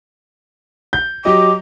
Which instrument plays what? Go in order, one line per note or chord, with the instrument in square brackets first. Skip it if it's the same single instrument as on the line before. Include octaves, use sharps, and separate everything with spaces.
[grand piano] G6
[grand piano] F#3 G4 D#5 [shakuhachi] D6